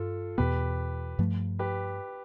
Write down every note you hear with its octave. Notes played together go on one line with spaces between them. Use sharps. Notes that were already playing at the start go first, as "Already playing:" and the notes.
Already playing: G2 F4 A4
E2 B2 B3 G4 B4
G2 F3 A3
G4 B4